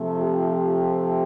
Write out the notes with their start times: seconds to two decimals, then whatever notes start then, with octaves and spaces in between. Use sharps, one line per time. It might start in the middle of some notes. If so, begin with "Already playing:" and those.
Already playing: C3 F3 A3
0.18 F4 G4